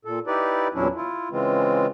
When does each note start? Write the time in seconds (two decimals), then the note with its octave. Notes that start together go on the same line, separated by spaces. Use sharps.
0.05 A#2 A4
0.27 D#4 E4 G4 B4 D5
0.74 E2 A#2 F#3 C#4 D4 E4
0.96 E4 F4
1.31 C#3 E3 G#3 C4 F4